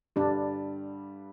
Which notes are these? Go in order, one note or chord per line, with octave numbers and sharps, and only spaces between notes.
G2 D3 G3 D4